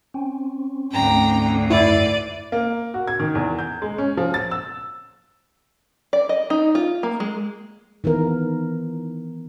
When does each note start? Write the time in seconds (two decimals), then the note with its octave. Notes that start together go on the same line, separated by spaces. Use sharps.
0.14 C4 C#4
0.92 D2 G#2 G5 A#5
1.70 F#2 E4 D5 D#7
2.52 A#3
2.94 F#4
3.08 G#6
3.20 D#3
3.35 E2
3.59 G6
3.82 G#3
3.98 C#4
4.17 F3
4.34 A6
4.51 E6
6.13 D5
6.29 D#5
6.50 D#4
6.75 F4
7.03 A#3
7.20 G#3
8.04 D#3 E3 B3 A#4